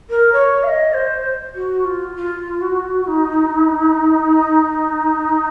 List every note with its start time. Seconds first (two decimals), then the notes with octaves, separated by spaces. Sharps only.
0.09 A#4
0.32 C#5
0.63 F5
0.68 D#5
0.93 C5
1.54 F#4
1.84 F4
2.16 F4
2.61 F#4
3.07 D#4